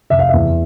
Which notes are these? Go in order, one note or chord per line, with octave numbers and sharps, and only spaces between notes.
F1 E5
F5
E2 E5